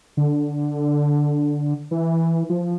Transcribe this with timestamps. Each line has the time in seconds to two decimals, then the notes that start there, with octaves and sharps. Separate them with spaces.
0.17 D3
1.91 E3
2.49 F3